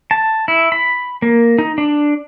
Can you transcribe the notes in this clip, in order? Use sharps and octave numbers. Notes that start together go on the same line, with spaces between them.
A5
E4
B5
A#3
D#4
D4